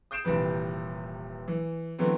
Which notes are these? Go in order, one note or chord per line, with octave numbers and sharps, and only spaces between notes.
D#6 G6 C7 D7 E7
D#1 C3 E3 B4
E3
D3 E3 F#3 A3 B3 C4